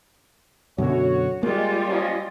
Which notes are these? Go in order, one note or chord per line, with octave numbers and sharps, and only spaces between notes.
F#2 B2 D3 F#4 C#5
G3 G#3 A#3 F4
F3 C#4 D#5